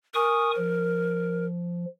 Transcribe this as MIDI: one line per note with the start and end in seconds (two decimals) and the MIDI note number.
0.14 1.46 70
0.14 0.51 80
0.14 0.51 85
0.14 0.51 87
0.57 1.85 53